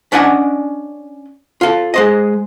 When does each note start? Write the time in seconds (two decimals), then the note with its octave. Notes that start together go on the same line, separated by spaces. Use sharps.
0.12 C#4 D4 D5 D#5 F#5 G#5
1.61 F4 A4
1.94 G#3 C5 D#5